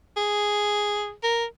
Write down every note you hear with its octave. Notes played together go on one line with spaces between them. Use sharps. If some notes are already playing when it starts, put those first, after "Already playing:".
G#4
A#4